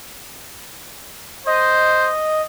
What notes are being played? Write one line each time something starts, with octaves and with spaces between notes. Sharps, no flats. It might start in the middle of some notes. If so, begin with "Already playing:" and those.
C5 D#5